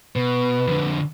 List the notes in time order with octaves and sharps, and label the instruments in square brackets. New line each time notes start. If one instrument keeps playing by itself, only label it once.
[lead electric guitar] B2 [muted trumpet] B4
[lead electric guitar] F2 D3